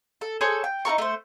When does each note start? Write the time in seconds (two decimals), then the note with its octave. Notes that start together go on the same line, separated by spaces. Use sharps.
0.21 A4
0.41 G#4 A4 C5 C#5
0.64 G5
0.85 D#4 E4 A#4 C#6
0.98 A3 C5